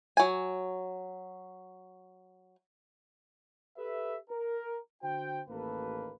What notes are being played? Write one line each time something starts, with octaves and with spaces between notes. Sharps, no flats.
F#3 G#5
G4 A4 B4 E5
A#4
D3 F#4 C5 G5
A1 D#2 A#3 A4 B4